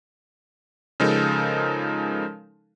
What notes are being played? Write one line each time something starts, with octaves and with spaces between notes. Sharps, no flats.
C#3 F3 G#3 D#4 A4 A#4